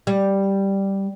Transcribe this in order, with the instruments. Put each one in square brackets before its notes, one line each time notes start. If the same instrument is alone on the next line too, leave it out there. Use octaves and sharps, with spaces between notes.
[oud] G3